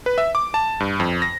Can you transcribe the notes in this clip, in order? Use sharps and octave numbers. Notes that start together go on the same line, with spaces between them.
B4
E5
D6
A5
G2
F2
A#6